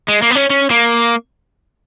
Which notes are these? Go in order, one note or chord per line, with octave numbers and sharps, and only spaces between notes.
G#3
A#3
B3
C#4
C#4
A#3